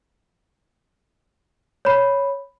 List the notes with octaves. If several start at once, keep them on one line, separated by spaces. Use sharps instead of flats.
C#5 B5